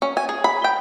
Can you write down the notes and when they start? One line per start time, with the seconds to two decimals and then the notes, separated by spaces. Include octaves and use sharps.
0.02 C#4
0.17 G#5
0.29 G#4
0.44 B5
0.64 G5